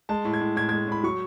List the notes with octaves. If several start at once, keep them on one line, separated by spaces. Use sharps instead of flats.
G#3 A5
A2
G#6
A2
A2 G#6
G#3 G#6
A2 B5
F#3 C#6